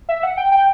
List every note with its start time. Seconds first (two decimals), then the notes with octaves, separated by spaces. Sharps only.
0.09 E5
0.23 F#5
0.37 G5
0.52 G5